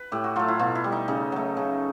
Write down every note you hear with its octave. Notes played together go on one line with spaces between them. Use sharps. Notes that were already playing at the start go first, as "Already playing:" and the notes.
Already playing: B4
A2 G4
F#4
F#3 A3 F4
E4
B2 F4
E4
G3
D#4
C#3 D#4
F#3 A3
C#3